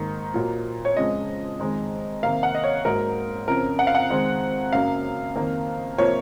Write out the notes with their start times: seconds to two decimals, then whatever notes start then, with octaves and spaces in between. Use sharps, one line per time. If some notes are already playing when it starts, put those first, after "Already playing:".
Already playing: G#2 D#3 A#3
0.34 A#2 F#3 A#3
0.85 C#5
0.97 F2 C#3 F3 G#3 D#5
1.60 F2 D#3 G#3
2.23 C3 D#3 A#3 F5
2.43 F#5
2.55 D#5
2.64 C#5
2.85 G#2 F#3 A#3 A#4
3.48 F2 C#3 F3 A#4
3.79 F#5
3.87 F5
3.95 F#5
4.10 F2 D#3 G#3 C4
4.72 F#2 C#3 F#3 A#3 F5
5.36 F2 D#3 A#3
5.98 C3 F3 A#3 C#5